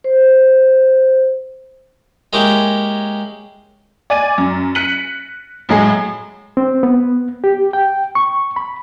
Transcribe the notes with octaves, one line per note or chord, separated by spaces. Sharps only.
C5
G#3 A#3 C#4 E4 G4
D5 G#5 A6 D#7
F#2
F#6 B6 C#7 D#7 F#7
A2 F#3 G#3 G#4
C4
B3
G4
G5
C#6
B5